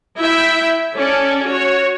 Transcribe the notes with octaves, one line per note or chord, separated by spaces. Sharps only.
E4 E5 G5
C#4 A4 D5
F#4 C#5